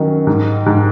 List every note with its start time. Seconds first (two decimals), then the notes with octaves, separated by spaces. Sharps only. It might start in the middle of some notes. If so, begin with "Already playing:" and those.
Already playing: F#2 D#3 F#3
0.27 G#2
0.66 G#2